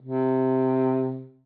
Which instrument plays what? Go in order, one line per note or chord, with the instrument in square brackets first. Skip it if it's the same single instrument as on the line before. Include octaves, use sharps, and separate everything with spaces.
[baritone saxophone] C3